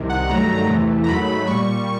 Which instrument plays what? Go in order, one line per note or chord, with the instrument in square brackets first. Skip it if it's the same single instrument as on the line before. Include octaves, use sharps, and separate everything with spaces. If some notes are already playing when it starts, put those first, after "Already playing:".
Already playing: [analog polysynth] C2 C3 D#3
F#5
G2 D#3 F#3 A3 A#5
E2 C3 E3 A3
A#5
G#2 D#3 F#3 A3 B5
A#2 G3 C#6